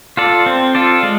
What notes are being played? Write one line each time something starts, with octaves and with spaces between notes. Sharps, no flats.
F4 A4 D5
C4
F4 A4 D5
G#3